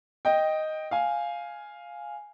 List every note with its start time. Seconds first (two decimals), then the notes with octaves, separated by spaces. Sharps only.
0.25 D#5 G5
0.91 F5 G#5